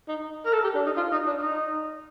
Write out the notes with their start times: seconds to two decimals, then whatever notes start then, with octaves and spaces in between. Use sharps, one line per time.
0.08 D#4
0.45 A#4
0.53 A4
0.64 G4
0.75 D4
0.86 D#4
0.97 F4
1.12 D#4
1.27 D4
1.41 D#4